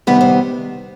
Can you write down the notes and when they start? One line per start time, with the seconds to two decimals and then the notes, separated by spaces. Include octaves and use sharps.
0.07 C3 D#3 G3 B3 B4
0.21 C5